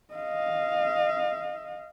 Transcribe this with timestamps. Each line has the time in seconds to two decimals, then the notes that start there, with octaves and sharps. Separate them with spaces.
0.14 D#5 F5